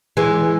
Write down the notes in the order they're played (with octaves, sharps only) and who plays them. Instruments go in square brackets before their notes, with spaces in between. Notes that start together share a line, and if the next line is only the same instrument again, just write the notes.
[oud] E3 G#3